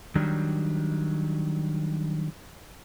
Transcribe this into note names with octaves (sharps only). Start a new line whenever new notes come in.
D#3 F#3 G3 D4